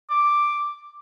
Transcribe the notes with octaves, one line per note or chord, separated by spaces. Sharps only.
D6